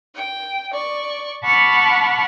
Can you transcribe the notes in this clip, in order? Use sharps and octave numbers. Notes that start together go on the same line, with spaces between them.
G5
D5 C#6
F#5 A5 B5 C#6 D6 F6